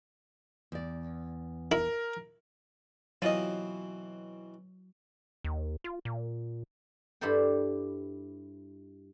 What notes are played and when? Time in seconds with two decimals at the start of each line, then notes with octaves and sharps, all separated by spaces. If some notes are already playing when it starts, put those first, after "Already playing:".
0.72 E2 D5
1.72 E4 A#4
3.22 B2 E3 F#3 C4 F4 D#5
5.44 D#2
5.84 F4
6.05 A#2
7.21 G2 E4 G4 A4 C5 G5